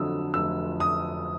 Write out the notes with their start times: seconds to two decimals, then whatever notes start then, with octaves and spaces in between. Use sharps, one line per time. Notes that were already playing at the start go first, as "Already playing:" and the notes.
Already playing: F1 F2 D3 F#3 D#6 E6
0.34 F1 E6
0.80 D#6